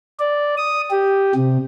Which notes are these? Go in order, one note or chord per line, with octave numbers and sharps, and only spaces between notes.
D5
D#6
G4
C3